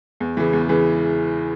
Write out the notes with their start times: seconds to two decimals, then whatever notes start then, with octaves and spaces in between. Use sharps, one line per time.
0.20 E2
0.37 C#3 E3
0.53 E2
0.69 C#3 E3